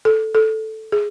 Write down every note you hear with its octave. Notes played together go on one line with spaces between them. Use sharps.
A4
A4
G#4